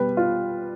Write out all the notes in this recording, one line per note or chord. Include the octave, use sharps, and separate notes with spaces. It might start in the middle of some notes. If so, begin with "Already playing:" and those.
Already playing: B2 G3 B3 B4
F4